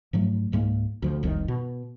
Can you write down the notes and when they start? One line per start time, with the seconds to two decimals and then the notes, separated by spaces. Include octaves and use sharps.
0.13 G#2 F3 F#3 A3
0.52 C#2 G#2 G#3 A#3
1.02 D2 F3
1.23 E1 C2 F2 D#3
1.48 B2